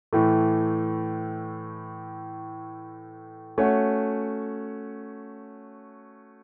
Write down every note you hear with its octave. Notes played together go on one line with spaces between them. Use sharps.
A2 E3 A3
A3 C#4 F#4 C#5